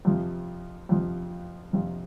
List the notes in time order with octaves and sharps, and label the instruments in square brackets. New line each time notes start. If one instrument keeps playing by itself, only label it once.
[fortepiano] F2 C3 F3
F2 C3 F3
F2 C3 F3